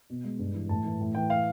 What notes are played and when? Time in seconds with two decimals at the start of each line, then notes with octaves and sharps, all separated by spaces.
0.10 B2
0.24 G#3
0.39 G2
0.54 E3
0.69 A2 A5
0.85 E3
1.00 A2
1.15 E3 G5
1.30 F5